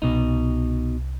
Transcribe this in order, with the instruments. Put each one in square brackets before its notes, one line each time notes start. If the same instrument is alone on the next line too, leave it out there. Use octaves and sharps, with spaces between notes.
[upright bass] C2 [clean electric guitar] B2 D#4